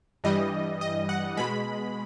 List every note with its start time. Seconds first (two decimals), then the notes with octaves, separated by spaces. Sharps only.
0.24 G2 E3 G3 D#5
0.81 D#5
1.09 F#5
1.37 B2 G#3 B5